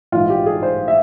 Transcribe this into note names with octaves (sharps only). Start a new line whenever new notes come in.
A#1 G#2 E3 F4
G4
G#4
C5
E5